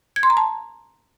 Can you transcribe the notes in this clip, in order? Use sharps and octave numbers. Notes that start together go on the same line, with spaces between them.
G#6
C6
A#5
A5